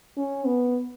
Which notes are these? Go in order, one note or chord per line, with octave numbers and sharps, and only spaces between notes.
C#4
B3